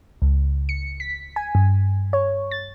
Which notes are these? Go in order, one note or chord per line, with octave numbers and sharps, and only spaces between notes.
C#2
C#7
B6
G#5
G2
C#5
A6